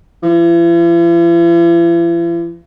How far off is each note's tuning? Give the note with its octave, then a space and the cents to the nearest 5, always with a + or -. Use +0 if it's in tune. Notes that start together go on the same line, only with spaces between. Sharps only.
E3 +45